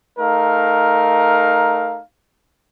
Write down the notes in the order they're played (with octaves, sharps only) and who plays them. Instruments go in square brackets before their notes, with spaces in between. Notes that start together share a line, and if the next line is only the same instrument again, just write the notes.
[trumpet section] A3 D#4 A#4 F5